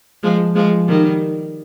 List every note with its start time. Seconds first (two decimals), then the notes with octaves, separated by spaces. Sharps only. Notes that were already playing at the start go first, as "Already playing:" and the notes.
0.23 F3 G#3
0.55 F3 G#3
0.87 D#3 G3